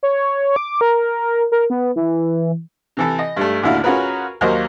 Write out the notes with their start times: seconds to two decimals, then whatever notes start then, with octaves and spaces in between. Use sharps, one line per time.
0.03 C#5
0.56 D6
0.81 A#4
1.52 A#4
1.70 B3
1.96 E3
2.97 C3 E3 A4
3.19 D#5
3.37 G2 G3 A3
3.63 A1 D#2 D3 E4 F#4 F5
3.84 C#4 F4 F#4 G#4 A#4 B4
4.41 D#2 F#3 A#3 C5 D#5